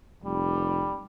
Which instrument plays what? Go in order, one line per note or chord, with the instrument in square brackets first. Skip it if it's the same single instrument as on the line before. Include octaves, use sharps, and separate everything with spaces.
[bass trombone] F1 [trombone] G3